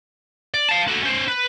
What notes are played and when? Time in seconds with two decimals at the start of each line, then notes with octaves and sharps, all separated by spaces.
0.54 D5
0.69 F5 A5
0.88 F#4 A4
1.03 C#4 C5
1.28 B4